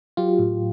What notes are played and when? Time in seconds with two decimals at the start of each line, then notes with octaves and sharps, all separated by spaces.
0.17 F#3 F4 G4
0.39 A2